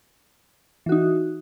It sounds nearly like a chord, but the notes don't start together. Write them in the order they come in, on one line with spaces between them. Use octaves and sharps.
E3 F#4 D#4